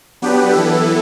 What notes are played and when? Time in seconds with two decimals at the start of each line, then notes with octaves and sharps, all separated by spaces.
0.22 F#3 B3 D4 G4 B4
0.52 E3 B3 E4 A4